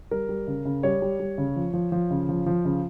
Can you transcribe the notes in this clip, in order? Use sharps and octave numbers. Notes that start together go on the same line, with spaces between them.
G3 A#4
G3
C#3
C#3
G3 C#5
G3
G3
C#3
F3
F3
F3
C#3
F3
F3
C#3